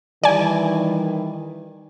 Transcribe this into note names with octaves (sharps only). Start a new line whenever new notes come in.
D#3 E3 G3 D5 G#5